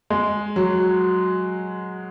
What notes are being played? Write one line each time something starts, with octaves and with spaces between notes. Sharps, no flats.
G#3
F#3